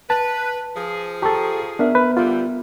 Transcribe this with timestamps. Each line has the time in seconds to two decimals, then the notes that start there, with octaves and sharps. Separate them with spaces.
0.10 B4 A5
0.76 F3 G#4
1.22 G4 A4 A5 A#5 C#6
1.79 B3 D4 A#4 E5
1.95 B4
2.17 D3 G3 F4